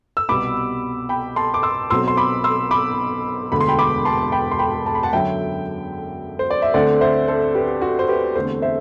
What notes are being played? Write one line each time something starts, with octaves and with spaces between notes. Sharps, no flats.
E6
C2 B2 G3 B3 B5 D6
G5 B5
A5 C6
D6
C6 E6
B1 B2 F#3 C4 C6 E6
C6
B5 D6
C6 E6
B5 D6
E1 D2 D3 B5
C6
G5 B5
B5 D6
A5 C6
G5 B5
C6
G5 B5
A5
B5
F#5 A5
F#2 D3 F#3 E5 G5
C5
D5
E5
D2 D3 A3 C4 D5 F#5
C5 E5
A4 C5
G4 B4
F#4 A4
C5
G4 B4
E2 D3 A3 C4 A4 C5
C5 E5